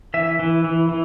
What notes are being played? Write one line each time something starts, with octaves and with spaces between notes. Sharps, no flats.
E3 E5
E3
E3
E3